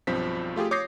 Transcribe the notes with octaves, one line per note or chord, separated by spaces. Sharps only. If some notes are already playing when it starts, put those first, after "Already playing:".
B1 G2 F3 C4 B6
A3 F4 G4 G#4
C#5 D6 D#6 G6 A#6 C7